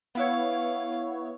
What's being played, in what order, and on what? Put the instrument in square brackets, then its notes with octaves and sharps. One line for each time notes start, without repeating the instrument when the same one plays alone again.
[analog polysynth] B3 E4 C#5 [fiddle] F5